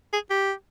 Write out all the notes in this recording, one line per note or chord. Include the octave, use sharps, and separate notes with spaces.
G#4
G4